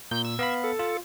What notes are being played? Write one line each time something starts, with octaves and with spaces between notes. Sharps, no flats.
A#2 G6
E6
B3 F5 B5
A4
F4